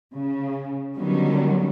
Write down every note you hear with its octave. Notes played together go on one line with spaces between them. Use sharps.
C#3
D3 D#3 F#3 G3 B3 C#4